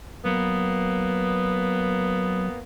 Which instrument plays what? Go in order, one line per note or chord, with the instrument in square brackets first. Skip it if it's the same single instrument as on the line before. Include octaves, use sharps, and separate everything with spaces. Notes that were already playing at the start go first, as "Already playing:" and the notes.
[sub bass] F#3 [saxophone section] A#3 B3